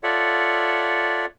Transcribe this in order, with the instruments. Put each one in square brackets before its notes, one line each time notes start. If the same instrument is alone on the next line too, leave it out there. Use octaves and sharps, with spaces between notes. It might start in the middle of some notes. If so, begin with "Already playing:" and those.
[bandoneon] F4 A4 C#5 D5 E5 F#5